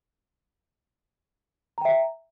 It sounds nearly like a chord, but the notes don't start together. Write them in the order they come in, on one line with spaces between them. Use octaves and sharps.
A#5 G5 E5